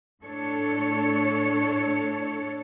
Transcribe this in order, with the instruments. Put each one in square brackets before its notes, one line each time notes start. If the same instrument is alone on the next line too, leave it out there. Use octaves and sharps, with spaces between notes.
[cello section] A2 D4 A4 C#5